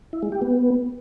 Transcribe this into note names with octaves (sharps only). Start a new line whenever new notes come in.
E4
G#3
G4
B3